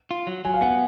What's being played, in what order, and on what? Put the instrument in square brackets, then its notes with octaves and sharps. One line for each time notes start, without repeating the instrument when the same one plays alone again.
[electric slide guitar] F4
F#3
[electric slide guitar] F#3 [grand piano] G#5
[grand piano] F5
[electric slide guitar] B3 [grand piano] F#5